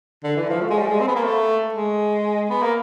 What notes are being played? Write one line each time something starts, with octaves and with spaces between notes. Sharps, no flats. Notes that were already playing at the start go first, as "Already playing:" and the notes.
D3
E3
F3
A3
G#3
G3
G#3
C4
B3
A#3
A3
G#3
B3
A#3